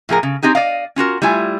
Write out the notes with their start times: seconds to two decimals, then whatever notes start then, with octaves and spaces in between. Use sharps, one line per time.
0.09 A2 F3 G#4 A#4
0.23 C#3
0.43 C4 D#4 G4 G#4
0.55 D5 D#5 F5
0.96 C#4 F4 F#4 A#4
1.22 G3 A3 E4 F4 G#5